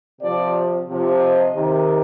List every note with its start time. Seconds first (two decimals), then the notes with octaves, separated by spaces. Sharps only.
0.21 C3 F3 D5
0.87 C3 F3
1.20 D#5
1.53 C3 D#3